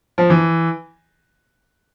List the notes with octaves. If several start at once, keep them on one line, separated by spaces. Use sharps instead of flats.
F3
E3